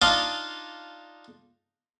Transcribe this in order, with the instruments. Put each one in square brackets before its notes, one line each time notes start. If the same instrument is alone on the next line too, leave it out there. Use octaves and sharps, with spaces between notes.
[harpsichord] D4 D#4 F4 D#5 F5 A5